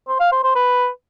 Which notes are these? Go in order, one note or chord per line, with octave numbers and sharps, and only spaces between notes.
C5
F5
C5
C5
B4